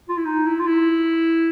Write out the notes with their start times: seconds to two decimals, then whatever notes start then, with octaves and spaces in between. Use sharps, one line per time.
0.09 F4
0.17 E4
0.26 D#4
0.47 E4
0.60 F4
0.67 E4